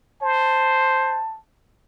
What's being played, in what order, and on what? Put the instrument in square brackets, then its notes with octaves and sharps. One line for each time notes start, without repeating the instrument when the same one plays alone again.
[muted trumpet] C5 [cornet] A5